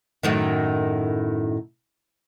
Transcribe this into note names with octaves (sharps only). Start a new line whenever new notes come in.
F#2 A2 D#3